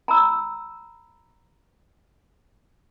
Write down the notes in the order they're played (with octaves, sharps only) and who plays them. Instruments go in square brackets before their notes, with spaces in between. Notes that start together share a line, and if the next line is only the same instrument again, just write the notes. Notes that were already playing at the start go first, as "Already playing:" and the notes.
[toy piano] A#5 B5 E6